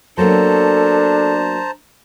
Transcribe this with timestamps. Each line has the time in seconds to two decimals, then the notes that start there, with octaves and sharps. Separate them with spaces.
0.18 F#3 A#3 B3 D4 A4 C5 A5 A#5